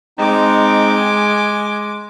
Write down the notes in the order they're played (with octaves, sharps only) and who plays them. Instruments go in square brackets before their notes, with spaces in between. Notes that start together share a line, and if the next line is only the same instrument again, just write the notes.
[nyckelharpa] G#3 D6 [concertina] C4 D#4
[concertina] G#5